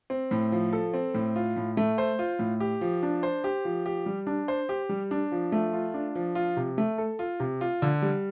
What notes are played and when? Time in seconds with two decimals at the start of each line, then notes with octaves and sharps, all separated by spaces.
0.10 C4
0.31 A2
0.52 F3
0.73 A4
0.94 C4
1.14 A2
1.36 F4
1.56 A2
1.77 A3
1.98 C5
2.19 F4
2.39 A2
2.60 G4
2.81 F3
3.03 D4
3.23 C5
3.44 G4
3.65 F3
3.86 G4
4.06 G3
4.27 D4
4.48 C5
4.69 G4
4.89 G3
5.11 D4
5.32 F3
5.52 A3
5.73 F4
5.94 D4
6.15 F3
6.35 F4
6.56 C3
6.78 A3
6.98 A4
7.19 F4
7.40 C3
7.61 F4
7.82 D3
8.02 G3